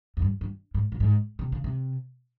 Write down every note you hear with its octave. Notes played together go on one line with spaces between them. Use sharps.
F2
G2
G2
G#2
A#2
G#2
C3
C#3
C3